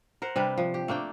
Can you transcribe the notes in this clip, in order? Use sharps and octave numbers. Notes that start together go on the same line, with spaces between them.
A#4 C5 F#5
C3 G3 D4 B4
F3
G4
A3 A#3 D4 G5